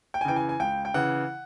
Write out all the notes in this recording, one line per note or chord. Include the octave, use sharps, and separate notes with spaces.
G5
G#5
C#3 E3 G5
G#5
G#5
C#2 G5
G5
C#3 E3 F#5